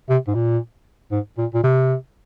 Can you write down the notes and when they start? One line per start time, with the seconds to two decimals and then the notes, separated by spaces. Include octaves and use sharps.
0.09 C3
0.27 G#2
0.34 A#2
1.11 G#2
1.38 A#2
1.54 A#2
1.63 C3